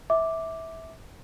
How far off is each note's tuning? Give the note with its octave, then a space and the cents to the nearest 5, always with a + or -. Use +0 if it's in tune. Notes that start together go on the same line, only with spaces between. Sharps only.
E5 -20 D6 +0